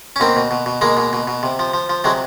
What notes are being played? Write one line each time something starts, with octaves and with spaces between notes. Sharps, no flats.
C#4
B2 A#3 C4
B2
B2
B2
B2 G#3 A#3
B2
B2
B2
C3
F3
F3
F3
C3 F#3 G#3